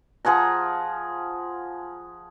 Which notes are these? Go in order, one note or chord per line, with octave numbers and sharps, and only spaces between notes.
F3 G#4 F#5 A#5